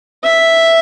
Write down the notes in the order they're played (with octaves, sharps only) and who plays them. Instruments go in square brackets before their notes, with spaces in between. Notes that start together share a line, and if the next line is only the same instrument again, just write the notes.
[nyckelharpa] E5